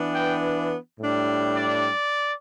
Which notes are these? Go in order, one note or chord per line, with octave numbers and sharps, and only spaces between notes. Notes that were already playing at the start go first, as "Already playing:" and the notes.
Already playing: E3 B3 D4
G5
A2 G3 D4
D5